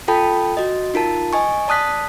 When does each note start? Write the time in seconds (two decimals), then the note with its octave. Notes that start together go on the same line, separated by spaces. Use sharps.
0.08 F4 A4 G5 A5 B5
0.57 F#4 D#5
0.94 D#4 F4 A#4 A5
1.33 D#5 G#5 C#6
1.68 D5 A5 D#6 F#6 B6